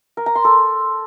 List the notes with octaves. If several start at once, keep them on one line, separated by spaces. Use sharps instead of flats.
A#4
A#5
C6
A4